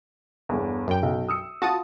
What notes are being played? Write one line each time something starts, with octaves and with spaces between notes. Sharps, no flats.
G1 E2
F#2 G5
B1
D#6 E6 C#7
F4 F#4 A5 D#6